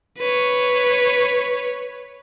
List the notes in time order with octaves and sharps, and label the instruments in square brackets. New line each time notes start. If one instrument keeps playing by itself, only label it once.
[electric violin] B4 C#5